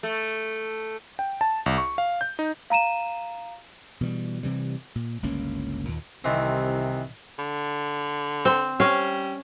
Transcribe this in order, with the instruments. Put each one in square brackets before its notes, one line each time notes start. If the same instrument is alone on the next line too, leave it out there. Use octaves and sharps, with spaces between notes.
[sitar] A3
[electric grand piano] G5
A5
C2
C#6
F5
G6
D#4
[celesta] F5 A#5 D#7 E7
[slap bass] B2 E3 F#3 G3
C3 E3 G3
A#2
G1 C#2 A#3 C#4
D#2 A#2
[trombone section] C2 C3 [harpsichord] D#3 E3 C4
[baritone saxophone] D3
[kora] C4
[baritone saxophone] G3 [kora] C#4 F5